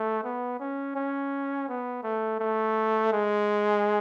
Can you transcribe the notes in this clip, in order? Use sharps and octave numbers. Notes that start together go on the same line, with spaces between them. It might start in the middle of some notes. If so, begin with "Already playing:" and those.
Already playing: A3
B3
C#4
C#4
B3
A3
A3
G#3